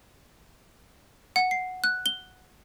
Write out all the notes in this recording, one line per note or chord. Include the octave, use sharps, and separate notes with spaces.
F#5
C7
F#6
G7